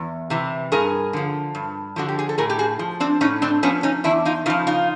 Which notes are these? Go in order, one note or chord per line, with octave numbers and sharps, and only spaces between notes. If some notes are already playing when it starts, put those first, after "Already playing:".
Already playing: E2
C3 E3
G2 G#4 A#4
D3 F3
G2
D3 F3 F#4
G4
G#4
A4
A2 G#4 A#4
G4
F#4 G#4
F3
C4 D4
A2 C#4 D#4
C4 D4
F3 B3 C#4
C#4 D#4
E2 D4 E4
D#4 F4
C#3 F3 D#4 F4
D#4 F4